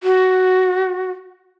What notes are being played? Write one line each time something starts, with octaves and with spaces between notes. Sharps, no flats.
F#4